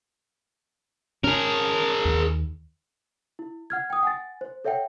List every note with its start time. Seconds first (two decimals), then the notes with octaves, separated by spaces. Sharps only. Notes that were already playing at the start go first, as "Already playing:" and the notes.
1.24 C#4 G#4 A#4
2.05 D#2
3.39 E4
3.70 F#5 F6 G#6
3.90 G5 D#6
4.03 F#5 G#5 A6
4.41 C5
4.65 A4 C#5 E5 F#5 G5